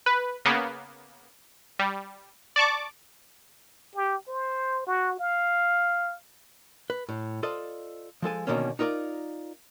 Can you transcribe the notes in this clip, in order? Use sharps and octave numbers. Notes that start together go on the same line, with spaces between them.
B4
C#3 A#3 B3
G3
D5 A5 C#6 D6
G4
C5
F#4
F5
B4
A2
F4 A4 C5 D5 D#5
F3 G#3 A4 G#5
B2 D3 D#3 A#3 C#4
D#4 F4 A#4 C#5 D5